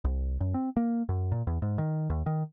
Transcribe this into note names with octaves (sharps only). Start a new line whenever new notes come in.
C2
F#2
C4
A#3
F#2
A#2
E2
G#2
D#3
D#2
D#3